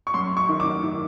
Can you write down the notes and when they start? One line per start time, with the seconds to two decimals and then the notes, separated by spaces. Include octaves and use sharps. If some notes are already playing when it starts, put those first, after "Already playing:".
0.07 C#6
0.14 F#2 C6
0.37 C#6
0.49 D#3
0.60 D6
0.83 D#3